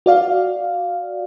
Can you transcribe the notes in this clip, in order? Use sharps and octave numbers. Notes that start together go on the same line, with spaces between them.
F#4 D5 F5